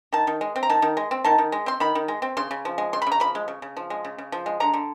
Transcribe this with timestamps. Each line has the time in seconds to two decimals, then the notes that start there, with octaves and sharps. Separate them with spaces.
0.12 D#3 A5
0.27 D#3
0.41 G#3
0.56 C4
0.63 A#5
0.70 D#3 A5
0.82 D#3
0.97 G#3
1.11 C4
1.24 D#3 A5
1.38 D#3
1.52 G#3
1.66 C4 C6
1.80 D#3 B5
1.95 D#3
2.08 G#3
2.22 C4
2.37 C#3 C6
2.51 C#3
2.65 F3
2.78 G#3
2.93 C#3 C6
3.02 B5
3.07 C#3
3.12 A#5
3.20 F3 B5
3.35 G#3
3.48 C#3
3.62 C#3
3.77 F3
3.90 G#3
4.05 C#3
4.18 C#3
4.32 F3
4.46 G#3
4.60 D3 A#5
4.74 D3